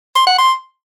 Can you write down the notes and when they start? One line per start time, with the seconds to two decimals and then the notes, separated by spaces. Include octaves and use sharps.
0.16 C6
0.27 F#5
0.38 C6